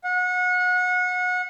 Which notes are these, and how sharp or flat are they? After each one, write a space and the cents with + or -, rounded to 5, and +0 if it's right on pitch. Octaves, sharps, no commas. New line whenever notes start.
F#5 -30